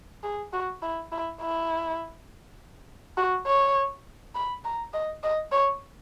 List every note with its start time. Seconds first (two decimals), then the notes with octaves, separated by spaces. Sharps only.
0.23 G#4
0.53 F#4
0.83 E4
1.12 E4
1.41 E4
3.17 F#4
3.47 C#5
4.35 B5
4.65 A#5
4.93 D#5
5.23 D#5
5.52 C#5